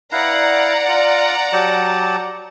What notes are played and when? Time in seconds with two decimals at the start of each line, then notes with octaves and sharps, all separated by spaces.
0.12 E4 B4 D5 F5 F#5 A#5
0.89 F4
1.53 F#3 G4 A5